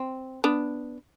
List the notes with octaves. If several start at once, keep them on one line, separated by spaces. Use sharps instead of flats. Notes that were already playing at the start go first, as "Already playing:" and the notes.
Already playing: C4
B3 D4